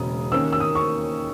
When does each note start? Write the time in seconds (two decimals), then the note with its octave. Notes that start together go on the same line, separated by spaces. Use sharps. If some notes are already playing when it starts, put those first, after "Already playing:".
Already playing: E1 C#3 G#3 D#6
0.31 D#2 D#3 A#3 C#4 E6
0.53 E6
0.60 D#6
0.75 C#6